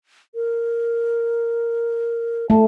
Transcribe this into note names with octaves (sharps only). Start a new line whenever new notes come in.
A#4
A3 A5